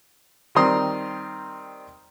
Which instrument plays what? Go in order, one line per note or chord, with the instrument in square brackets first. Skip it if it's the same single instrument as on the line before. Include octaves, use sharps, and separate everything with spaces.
[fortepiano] D#3 G3 C4 A#5 C6 D#6